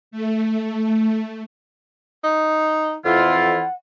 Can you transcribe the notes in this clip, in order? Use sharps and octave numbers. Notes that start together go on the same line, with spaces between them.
A3
D#4
F2 E3 E4 F4 F#5